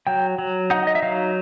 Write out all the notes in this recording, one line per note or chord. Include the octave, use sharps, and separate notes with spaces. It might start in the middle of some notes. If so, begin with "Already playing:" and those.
F#3 G5
F#3
D#4 F#5
D#5
E5
F#3 F5